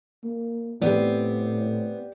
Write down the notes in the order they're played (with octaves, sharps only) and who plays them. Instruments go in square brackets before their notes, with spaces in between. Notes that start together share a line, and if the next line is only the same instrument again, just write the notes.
[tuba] A#3
[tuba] A2 [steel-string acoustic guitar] B3 C4 [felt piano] G4 D5